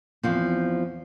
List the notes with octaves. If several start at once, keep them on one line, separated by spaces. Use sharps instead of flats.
E2 F3 C4